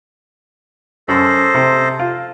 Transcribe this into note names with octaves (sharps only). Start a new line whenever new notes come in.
F#2 A4 C5 D#5
C3
F4